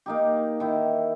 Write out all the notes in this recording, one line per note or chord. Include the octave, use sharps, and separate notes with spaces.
A#3 D#4 G4
D#3 E4